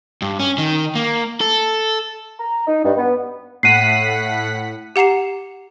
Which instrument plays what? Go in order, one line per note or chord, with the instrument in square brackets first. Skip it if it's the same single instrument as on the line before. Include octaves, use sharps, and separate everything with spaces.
[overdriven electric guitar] G2
C#4
D#3
A#3
A4
[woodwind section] A#5
D#4
G2
B3
[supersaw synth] A2 F#5 B6 [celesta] C7 D#7
[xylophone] G4 F#5 A#5 C7 E7